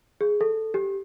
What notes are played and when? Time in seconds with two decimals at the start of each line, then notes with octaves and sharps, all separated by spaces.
0.21 G#4
0.41 A4
0.74 G4